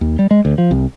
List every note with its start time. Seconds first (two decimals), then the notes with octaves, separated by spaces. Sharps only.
0.01 D#2
0.19 G3
0.31 G#3
0.45 D2
0.58 F3
0.71 C2